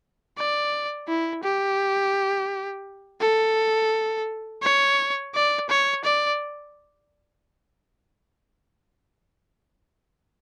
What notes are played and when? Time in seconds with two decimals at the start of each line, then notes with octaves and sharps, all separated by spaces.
0.38 D5
1.08 E4
1.44 G4
3.21 A4
4.62 C#5
5.34 D5
5.69 C#5
6.04 D5